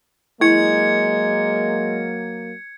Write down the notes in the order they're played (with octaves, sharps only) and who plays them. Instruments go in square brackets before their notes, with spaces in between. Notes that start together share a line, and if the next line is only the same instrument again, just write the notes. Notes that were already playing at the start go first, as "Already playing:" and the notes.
[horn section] F#3 A#3 [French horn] G#3 [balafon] E4 [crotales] G#6 C#7